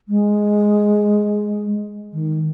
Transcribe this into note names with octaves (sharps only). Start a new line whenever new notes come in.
G#3
D#3